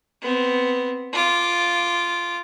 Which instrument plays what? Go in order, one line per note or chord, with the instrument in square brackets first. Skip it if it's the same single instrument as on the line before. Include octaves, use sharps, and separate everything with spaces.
[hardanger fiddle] B3 C4
F4 D6